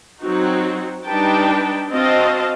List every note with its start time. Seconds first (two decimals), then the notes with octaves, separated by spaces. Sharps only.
0.20 F#3 C4 D#4 F#4
1.05 G3 D4 D#4 B4 G5 A5
1.90 C4 F#4 D#5 F5 A5